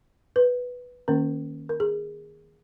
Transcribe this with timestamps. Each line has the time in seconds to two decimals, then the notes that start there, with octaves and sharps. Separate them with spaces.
0.36 B4
1.08 D#3 A#3 C#4 A#4
1.69 A#4
1.80 G#4